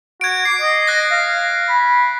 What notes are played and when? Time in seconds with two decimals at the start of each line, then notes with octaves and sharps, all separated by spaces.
0.21 F#4 G#6 D7
0.45 D6 C7
0.61 D#5
0.87 F#6 A#6
1.12 F5
1.68 B5